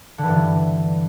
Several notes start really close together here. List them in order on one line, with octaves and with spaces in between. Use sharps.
D3 E3 G2